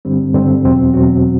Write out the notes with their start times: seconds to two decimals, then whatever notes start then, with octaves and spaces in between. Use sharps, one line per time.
0.05 G2 D3 G3 C4
0.34 G2 D3 G3 C4
0.64 E2 B2 F#3 C4 F#4
0.94 E2 B2 F#3 C4 F#4